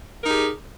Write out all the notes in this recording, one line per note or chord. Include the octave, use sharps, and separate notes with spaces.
D#4 G4 G#4 A#4